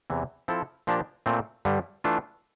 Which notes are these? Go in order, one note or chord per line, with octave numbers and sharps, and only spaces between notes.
E2 C3 E3
F3 C4 E4 A4
A#2 F3 A#3 D4 G4
A#2 A3 C4
G2 D3 G3
E3 A3 D4 F4